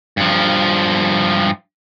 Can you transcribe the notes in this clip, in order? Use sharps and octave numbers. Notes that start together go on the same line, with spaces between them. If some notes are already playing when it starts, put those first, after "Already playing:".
G2 F3